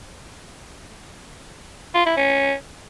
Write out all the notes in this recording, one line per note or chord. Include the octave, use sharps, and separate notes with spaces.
F4
E4
C#4